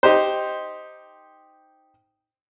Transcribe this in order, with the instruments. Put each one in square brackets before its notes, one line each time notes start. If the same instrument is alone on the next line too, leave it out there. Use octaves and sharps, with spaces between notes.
[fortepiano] D#4 G4 C5